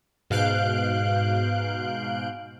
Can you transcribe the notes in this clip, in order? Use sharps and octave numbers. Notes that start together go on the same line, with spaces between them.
G#2 B2 F5 F#6 G6 D7